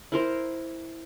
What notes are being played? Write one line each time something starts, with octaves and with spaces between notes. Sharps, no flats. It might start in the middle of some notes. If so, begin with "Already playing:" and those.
E4 A#4 C5